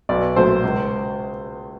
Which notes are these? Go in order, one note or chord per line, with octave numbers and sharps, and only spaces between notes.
B1 D5
A#2 F#3 A3 C5
C#2